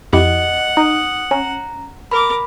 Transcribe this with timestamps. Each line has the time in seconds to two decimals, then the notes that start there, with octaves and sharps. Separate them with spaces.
0.13 F2 E4 G4 D#5 F#5
0.77 D#4 D#6
1.31 C#4 A#5
2.11 A#4 B5 D6